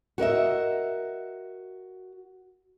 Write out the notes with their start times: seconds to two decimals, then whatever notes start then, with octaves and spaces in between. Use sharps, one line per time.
0.18 F#4 A#4 D#5 E5